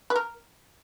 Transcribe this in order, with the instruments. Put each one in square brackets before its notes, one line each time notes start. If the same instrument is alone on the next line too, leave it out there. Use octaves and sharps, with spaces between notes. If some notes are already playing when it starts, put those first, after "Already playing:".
[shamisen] B4
A#4